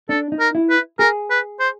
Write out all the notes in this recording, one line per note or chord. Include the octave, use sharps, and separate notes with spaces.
D4 A4
D#4
A#4
E4
B4
G#4 A#4
B4
C5